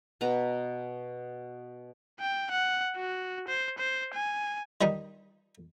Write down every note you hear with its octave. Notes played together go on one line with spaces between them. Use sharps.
B2 B4 A#5
G5
F#5
F#4
C5
C5
G#5
D#3 G3 D4 D#4